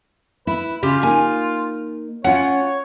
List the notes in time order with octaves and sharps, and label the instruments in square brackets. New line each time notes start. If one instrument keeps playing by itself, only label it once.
[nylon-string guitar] E4 [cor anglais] B4
[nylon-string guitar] C#3 [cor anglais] F4 [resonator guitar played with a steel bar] G4
[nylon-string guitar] A#3 D#4 [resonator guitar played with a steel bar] G#5
[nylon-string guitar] C#4 F4 [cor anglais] C#5 [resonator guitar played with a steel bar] F#5